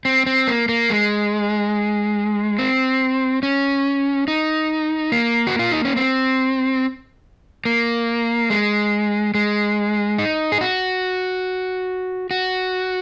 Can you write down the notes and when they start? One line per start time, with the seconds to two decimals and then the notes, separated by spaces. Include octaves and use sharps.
0.05 C4
0.26 C4
0.48 A#3
0.69 A#3
0.90 G#3
2.59 C4
3.43 C#4
4.28 D#4
5.12 A#3
5.47 F#4
5.59 F4
5.72 D#4
5.85 C#4
5.96 C4
7.65 A#3
8.50 G#3
9.34 G#3
10.18 D#4
10.52 G#4
10.61 F#4
12.31 F#4